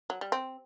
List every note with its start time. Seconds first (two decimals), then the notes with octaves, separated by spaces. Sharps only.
0.10 F#3
0.21 G3
0.32 C4